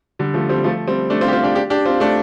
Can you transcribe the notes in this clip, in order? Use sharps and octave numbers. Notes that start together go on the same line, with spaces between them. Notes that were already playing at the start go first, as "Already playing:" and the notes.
D3 G3
F3 A3
G3 C4
F3 A3
G3 C4
A3 D4
C4 F4
G4
C4 F4
D4 G4
D4 G4
D4 G4
C4 F4
A3 D4